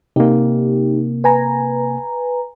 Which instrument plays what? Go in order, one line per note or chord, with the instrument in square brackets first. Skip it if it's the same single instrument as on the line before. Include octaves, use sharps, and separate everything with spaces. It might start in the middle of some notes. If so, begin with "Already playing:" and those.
[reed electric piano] C3 A#3 [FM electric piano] D#4 G4
[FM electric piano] B4 G#5 A#5